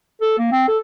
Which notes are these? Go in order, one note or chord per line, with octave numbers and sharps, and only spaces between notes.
A4
A#3
C4
A4